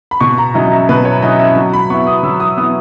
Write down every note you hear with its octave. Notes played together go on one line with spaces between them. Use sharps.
B5
B2 C#6
A#5
F#3 C#4 E4 D#5
E5
B2 B4
C#5
F#3 C#4 E4 D#5
E5
F#3
B5
B3 E4 C#6
D#6
F#3 E6
D#6
B3 E4 D#6